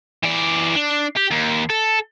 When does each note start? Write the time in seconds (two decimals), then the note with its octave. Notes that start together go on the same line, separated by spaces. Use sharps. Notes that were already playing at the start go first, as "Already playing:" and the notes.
0.23 E3 D5
0.75 D4
1.17 G4
1.31 D#2
1.70 A4